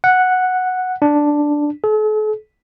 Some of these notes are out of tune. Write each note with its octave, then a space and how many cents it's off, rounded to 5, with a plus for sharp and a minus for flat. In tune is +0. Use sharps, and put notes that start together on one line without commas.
F#5 -5
D4 +0
A4 -45